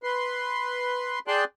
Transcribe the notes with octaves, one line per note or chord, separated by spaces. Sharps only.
B4 C6
G#4 D5 G5 A5 C6 F#6